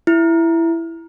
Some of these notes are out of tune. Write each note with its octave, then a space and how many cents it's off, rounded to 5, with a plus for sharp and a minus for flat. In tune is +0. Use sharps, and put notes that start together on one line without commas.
E4 +10